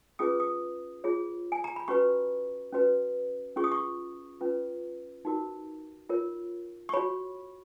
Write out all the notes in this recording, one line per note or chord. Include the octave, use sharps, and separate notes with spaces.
C#4 F4 G#4 B4 D#6
D#6
F4 G#4 C#5
G#5
A#5
B5
C#4 F#4 B4 C#6
C#4 F#4 B4
C#4 F4 G#4 C#6
D#6
C#6
C#4 F4 B4
D#4 F#4 A#4
F4 A#4 C#5
C#6
F#4 C#5 B5